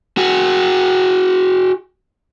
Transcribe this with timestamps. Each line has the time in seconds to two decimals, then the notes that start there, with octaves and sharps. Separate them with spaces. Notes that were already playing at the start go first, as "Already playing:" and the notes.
0.17 F#4 G#4